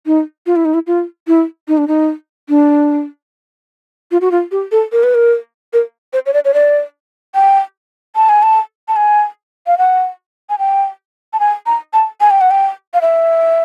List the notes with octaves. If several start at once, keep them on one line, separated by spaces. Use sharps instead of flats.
D#4
F4
E4
D#4
E4
F4
E4
D#4
D4
D#4
D4
F4
F#4
F4
G4
A4
A#4
B4
A#4
A#4
C5
C#5
D5
C#5
D5
G5
A5
G#5
A5
A5
G#5
F5
F#5
G#5
G5
A5
G#5
A#5
A5
G#5
G5
F#5
G5
F5
E5